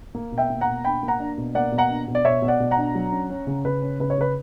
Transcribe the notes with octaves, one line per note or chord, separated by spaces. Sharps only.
A#3
B2
E5 G5
A#3
F#5 A#5
B2
D4 G5 B5
A#3
F#5 A#5
D4
B2
A#3 D5 F#5
B2
F#5 A#5
D4
B2
D5
B2 C#5 E5
B2
D5 F#5
B2
F#5 A#5
D4
F#3
C#4
C#4
C#3
C#3 B4
C#4
C#3 B4
C#5
C#3 B4